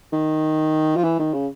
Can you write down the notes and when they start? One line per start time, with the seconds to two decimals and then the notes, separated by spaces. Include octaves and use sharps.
0.13 D#3
0.96 F3
1.04 E3
1.19 D#3
1.34 C#3